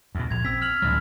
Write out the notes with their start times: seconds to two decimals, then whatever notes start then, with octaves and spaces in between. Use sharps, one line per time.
0.15 E2 G2 B2
0.31 A#1 G#6 F7
0.45 C4 E6 B6
0.62 F6 F7 F#7
0.82 A1 D2 F#3 F6